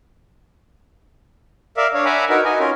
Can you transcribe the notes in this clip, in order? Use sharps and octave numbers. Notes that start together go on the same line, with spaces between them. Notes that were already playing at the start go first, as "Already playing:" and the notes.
A#4 D5 E5 F5
D4 C#5 F5
E5 F#5 G#5 A#5 B5 D6
D#4 F#4 A#4 B4
D#4 F#4 D#5 G#5
C#4 F4 A#4